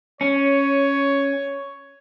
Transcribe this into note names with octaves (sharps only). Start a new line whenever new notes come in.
C#4 C#5